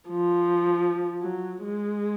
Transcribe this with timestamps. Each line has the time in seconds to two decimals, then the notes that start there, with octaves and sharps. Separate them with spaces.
0.09 F3
1.22 F#3
1.64 G#3